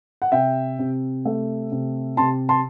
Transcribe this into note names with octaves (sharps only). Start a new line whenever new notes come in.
F#5
C3 E5 G5
C3
A3
C3
C3 A5 C6
A5 C6